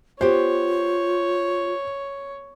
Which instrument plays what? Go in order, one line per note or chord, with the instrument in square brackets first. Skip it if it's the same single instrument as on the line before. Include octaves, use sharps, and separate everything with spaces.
[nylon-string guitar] B3 G4 [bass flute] F4 [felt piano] C5 [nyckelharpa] C#5